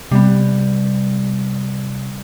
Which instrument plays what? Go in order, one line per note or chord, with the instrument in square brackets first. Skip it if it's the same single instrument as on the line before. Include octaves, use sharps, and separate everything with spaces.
[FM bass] C3 [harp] G3 B3